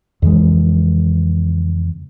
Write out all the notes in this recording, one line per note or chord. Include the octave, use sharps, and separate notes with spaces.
F2 C#3 E3 G#3